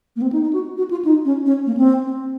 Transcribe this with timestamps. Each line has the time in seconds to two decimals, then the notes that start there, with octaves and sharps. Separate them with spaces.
0.16 A#3
0.22 C4
0.32 D#4
0.43 D#4
0.53 F#4
0.77 F#4
0.91 F4
1.05 D#4
1.25 C#4
1.46 C#4
1.66 A#3
1.77 C4